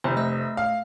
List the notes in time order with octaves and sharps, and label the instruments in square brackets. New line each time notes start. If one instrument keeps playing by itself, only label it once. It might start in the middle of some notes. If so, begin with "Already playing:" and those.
[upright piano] F1 [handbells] C5
[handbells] A3 D#5 E6
[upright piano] F5